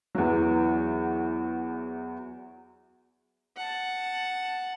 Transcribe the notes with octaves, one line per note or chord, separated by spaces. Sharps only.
E2 E3 F#3
F#5 A5